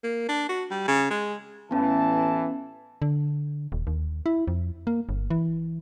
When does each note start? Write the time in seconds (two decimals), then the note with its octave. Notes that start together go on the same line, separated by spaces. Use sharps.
0.04 A#3
0.29 D4
0.49 F#4
0.71 G3
0.88 C#3
1.10 G#3
1.71 A1 E3 B3 C#4 A5
3.02 D3
3.72 D#1
3.87 D#2
4.26 E4
4.48 F2
4.87 A#3
5.09 G1
5.31 E3